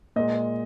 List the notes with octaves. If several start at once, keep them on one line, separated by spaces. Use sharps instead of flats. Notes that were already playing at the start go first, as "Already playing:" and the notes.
A#2 G#3 D#5